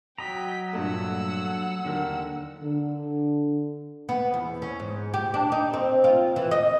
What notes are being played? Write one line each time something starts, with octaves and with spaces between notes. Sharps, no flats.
F#3 D#5 G5 A#5 B6
G2 A#2 A3 F#5 E6
D#2 D3 A#4
D3
B3
E2
C#4
G#2
G4
D4
D#4
C4
F4
E3
D#5